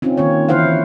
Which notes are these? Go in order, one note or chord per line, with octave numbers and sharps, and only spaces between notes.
C4 C#4 D#4 F4
D#3 A#3 F4 C#5
D3 E3 E4 C5 F5 F#5